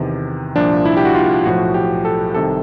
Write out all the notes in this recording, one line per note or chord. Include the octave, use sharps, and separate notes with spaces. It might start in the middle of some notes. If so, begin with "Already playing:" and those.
Already playing: E2 C3 D#3
C2 A#2 F3 D4
E4
G4
F#4
F4
B1 A2 F3 F#4
G4
A4
C2 C3 D#3 A4